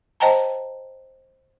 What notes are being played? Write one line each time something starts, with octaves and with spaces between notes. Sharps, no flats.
C5 D#5 G5 A5 A#5